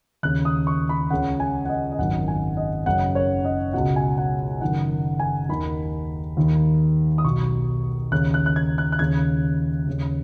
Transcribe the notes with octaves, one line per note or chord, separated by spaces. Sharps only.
D#2 C#3 F#6
D#6
C#6
B5
C#2 C#3 F#5
G#5
F#5
D#5
D#5
G#1 F#2 D#3 F#5
G#5
D#5
F#1 F#2 C#3 F#5
C#5
D#5
C#2 B2 F#5
G#5
F#5
F#1 F#2 D#3 F#5
G#5
D#2 D#3 B5
D#2 D#3
D#6
B1 B2 C#6
D#2 C#3 F#6
F#6
F#6
G#6
F#6
F#6
D#2 C#3 G#6
D#2 C#3